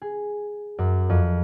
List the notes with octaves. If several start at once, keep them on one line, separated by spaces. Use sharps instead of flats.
G#4
F#2
F2